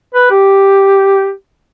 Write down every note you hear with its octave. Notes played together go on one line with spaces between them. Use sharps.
B4
G4